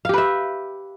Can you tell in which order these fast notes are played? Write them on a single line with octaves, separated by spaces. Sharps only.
F5 G4 B4 E5